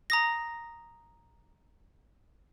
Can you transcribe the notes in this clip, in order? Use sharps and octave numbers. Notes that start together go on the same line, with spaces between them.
A#5 D#6 A#6